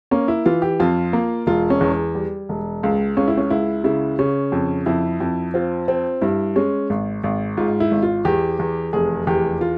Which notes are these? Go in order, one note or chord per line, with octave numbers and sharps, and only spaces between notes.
A#3 C#4
E4
E3 F4
G4
F2 F4
A#3
E1 F4
C#4
E2
G3
E1
C#2
C#2 C#4
E4
C#4
C#2 E4
C#3 E4
C#3 C#4
F2
F2 E4
F2
C4 F4
C4
G2 E4
G#3 C#4
G#1
G#1
G#2 F4
E4
G#1
F4
E2 G4
E2
F1 G#4
E2 G4
F4